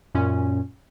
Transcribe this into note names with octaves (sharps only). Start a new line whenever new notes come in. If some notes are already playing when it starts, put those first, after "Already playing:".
F#2 A#2 C#4